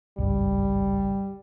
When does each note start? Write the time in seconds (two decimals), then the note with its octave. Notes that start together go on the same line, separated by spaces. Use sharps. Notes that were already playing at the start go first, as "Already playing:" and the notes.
0.18 G#1 C#2 G2 G3